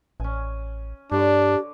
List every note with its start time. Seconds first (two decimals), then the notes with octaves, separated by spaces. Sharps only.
0.20 A1 C#4 G#5
1.12 G2 D3 D4 G4 C#5 D5